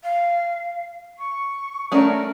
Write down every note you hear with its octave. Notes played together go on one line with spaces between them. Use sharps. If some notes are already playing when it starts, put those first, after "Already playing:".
F5
C#6
A3 C#4 D4 A#4